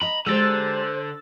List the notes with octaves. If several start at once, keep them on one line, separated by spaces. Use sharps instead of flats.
D#5 A#5 B5
D3 G#3 G4 C5 A#5 E6 A6